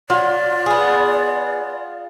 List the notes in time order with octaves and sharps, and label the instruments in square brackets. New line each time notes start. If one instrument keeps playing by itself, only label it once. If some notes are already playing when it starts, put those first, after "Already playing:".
[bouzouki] F#3 [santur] F4 [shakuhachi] D5
[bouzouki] B3 G#4